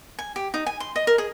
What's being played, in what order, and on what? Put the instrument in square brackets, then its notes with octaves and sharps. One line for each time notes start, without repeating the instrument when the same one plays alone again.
[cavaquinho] G#5
G4
D#4
G#5
C6
D#5
A#4
G#4